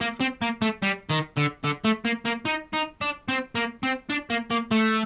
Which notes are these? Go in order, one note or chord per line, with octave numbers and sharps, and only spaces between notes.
A#3
C4
A#3
A3
G3
D#3
D3
D3
A3
A#3
A#3
D#4
D#4
D4
C4
A#3
C4
D4
A#3
A#3
A3